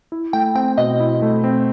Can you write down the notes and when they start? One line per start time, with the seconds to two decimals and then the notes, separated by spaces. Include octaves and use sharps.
0.12 E4
0.33 A3 G5
0.55 C4 G5
0.78 B2 D#5
1.00 E4
1.22 A3
1.44 C4